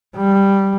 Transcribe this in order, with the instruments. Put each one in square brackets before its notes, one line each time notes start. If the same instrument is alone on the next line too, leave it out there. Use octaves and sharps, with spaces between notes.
[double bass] G3